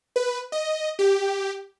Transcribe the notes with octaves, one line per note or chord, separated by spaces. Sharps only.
B4
D#5
G4